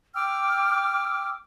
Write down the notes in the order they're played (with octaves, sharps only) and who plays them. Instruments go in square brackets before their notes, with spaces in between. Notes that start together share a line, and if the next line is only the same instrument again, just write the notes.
[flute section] G5 D6 E6 F6